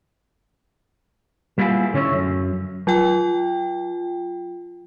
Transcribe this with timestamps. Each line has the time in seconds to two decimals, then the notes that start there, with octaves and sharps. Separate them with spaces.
1.58 G3 A#3 B3 E4 F4 G#4
1.93 A2 D3 C#4 C#5 E5
2.12 F#2
2.87 F#3 F4 G5